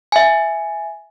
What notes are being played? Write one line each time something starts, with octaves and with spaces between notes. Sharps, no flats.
E5 G#5